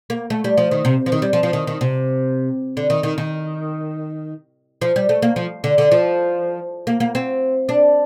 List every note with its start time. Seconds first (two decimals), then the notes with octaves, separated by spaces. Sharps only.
0.10 A#3
0.30 A3
0.44 G3
0.58 F3
0.71 D#3
0.85 C3
1.06 F3
1.12 D#3
1.22 G3
1.33 F3
1.43 F3
1.53 D#3
1.67 D#3
1.81 C3
2.77 D3
2.90 D#3
3.03 D#3
3.18 D#3
4.82 F3
4.96 G3
5.09 A3
5.22 A#3
5.36 F3
5.64 D3
5.78 D3
5.92 F3
6.87 A#3
7.00 A#3
7.15 C4
7.69 D4